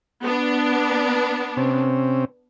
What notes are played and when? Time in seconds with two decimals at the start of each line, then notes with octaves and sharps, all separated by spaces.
0.23 B3 D4
1.57 C3 C4 C#4